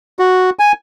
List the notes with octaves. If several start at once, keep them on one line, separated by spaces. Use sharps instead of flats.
F#4
G#5